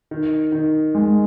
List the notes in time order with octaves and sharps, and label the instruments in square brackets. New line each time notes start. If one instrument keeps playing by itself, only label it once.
[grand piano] D#3
D#3
G#3